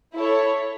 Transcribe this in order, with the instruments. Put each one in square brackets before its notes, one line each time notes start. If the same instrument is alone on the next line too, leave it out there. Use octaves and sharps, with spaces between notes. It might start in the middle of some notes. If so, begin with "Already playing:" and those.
[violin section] E4 A4 C#5